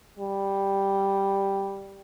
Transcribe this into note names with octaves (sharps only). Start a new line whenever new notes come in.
G3